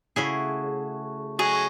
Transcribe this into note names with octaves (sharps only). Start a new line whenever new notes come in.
C#3 A3 E4 F#4 G#4
F#3 G#4 C#5 D#5 C#6